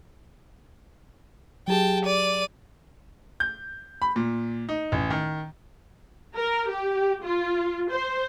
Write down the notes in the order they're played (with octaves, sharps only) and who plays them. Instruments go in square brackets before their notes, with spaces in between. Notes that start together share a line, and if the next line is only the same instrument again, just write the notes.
[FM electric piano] F#3 G4 G#4 [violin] G5 A5
[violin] D5 D#7
[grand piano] G6
B5
A#2
D#4
A1
D#3
[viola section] A#4
G4
F4
C5